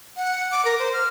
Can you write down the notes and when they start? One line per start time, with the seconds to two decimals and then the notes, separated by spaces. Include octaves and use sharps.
0.17 F#5
0.51 D6
0.65 A#4
0.79 C5
0.93 F6